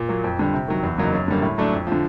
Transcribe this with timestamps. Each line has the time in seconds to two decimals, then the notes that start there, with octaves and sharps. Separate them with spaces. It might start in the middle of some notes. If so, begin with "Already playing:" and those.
Already playing: A#2
0.09 F#3 A#3
0.24 F2
0.39 D3 G3
0.54 C3
0.68 D#3 F#3
0.83 E2
0.98 C#3 F#3 A#3 D#4
1.13 F#2
1.28 D3 G3 A#3
1.42 A2
1.58 F#3 A3 D4
1.73 F2
1.87 F3
1.92 D3